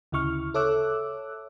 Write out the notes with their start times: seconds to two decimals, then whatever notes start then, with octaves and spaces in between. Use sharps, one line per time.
0.12 D2 C#3 E4 C#6 F6
0.54 A4 C#5 E5 D6 E6 F#6